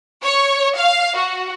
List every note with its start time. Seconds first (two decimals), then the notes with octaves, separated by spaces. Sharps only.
0.24 C#5
0.78 F5
1.16 F#4